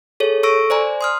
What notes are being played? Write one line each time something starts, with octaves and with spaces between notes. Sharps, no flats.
G#4 A4 C#5
A4 C#6 E6 A#6 D7
C5 D5 G#5 A#5
C6 D#6 F6